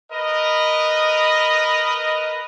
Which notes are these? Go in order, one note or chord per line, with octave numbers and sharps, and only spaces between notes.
A#4 B4 D#5